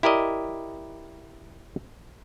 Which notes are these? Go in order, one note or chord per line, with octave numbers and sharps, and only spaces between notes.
E4 G4 A#4 D5 D#5